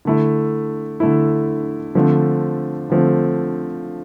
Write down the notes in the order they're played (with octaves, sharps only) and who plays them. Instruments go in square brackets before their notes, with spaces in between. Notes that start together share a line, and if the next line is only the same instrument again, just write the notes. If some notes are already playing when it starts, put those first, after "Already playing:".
[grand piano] D3 A3 E4
D3 A3 E4
D3 F3 A3 C4
D3 F3 A3 C4